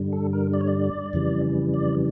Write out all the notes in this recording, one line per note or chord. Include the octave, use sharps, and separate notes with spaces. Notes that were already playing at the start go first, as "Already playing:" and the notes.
Already playing: G2 D3 G3
A4
A#4
D5
C#5
D5
F2 C#3 E3 G3
D5